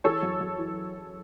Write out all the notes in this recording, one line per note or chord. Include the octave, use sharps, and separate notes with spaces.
E3 A4 C#5
F#2
F#2
E3